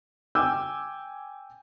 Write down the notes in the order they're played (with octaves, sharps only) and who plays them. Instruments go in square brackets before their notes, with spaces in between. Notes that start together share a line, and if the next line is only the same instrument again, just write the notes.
[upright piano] G5 G#5 D6 E6 G6